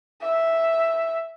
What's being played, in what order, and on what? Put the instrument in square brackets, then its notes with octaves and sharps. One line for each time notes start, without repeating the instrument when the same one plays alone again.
[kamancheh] E5